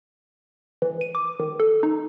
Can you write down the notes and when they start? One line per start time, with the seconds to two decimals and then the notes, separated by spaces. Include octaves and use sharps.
0.82 E3
1.01 D#7
1.15 D6
1.40 D#3
1.60 A4
1.83 D#4